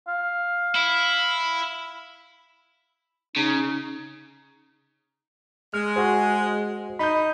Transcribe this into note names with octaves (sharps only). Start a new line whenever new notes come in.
F5
E4
C#3 D#4
G#3 F6
F#4 G#4 C5
D#4 B5 G6